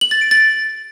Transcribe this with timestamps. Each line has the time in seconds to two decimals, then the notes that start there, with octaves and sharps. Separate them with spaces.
0.01 F#7
0.11 A6
0.21 D7
0.31 A6